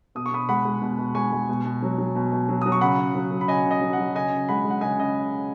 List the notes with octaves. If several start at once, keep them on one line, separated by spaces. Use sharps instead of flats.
B2 D#6
C#6
B2 B5 D#6
G#3 F#5 B5
G#3
B2
B2
G#3 G#5 C#6
G#3
B2
B2
F#3
F#3
B2
B2
F#3
F#3 D#6
C#6
C#3 F#5 B5
C#3
F#3
F#3
B5
C#3 D#5 G#5
C#3
D#5
F#3
F#5
F#3
C#3 D#5 G#5
C#3
G#3 F#5 B5
G#3
F#5
C#3 D#5 G#5
C#3 D#5